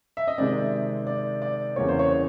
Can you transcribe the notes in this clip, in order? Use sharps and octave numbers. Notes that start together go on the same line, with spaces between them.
E5
D#5
C3 D#3 G#3 C4 D5
D5
D5
E2 C#3 E3 G3 A#3 C#5
C5
C#5